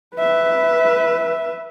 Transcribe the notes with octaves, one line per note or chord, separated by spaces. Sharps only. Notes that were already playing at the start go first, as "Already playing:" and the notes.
B4 E5